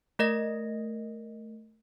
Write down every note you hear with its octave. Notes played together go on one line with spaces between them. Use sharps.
A3 A#4 D#5 A#6